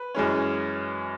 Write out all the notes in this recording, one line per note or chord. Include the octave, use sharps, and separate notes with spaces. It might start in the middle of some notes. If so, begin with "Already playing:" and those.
Already playing: B4
F#2 E3 G#3 C#4